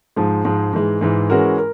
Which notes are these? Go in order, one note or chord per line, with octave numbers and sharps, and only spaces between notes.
G#2 F3 G#3
G#2 F3 G#3
G#2 E3 G#3
G#2 E3 G#3
E3 G#3 C#4 F#4 A#4
A#4